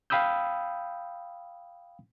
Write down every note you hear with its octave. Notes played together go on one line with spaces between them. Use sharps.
F5 G5 B5 D#6 E6 G6